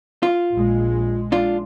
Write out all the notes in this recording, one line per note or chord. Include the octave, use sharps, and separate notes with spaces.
F4
A#1 G#3
D4 F4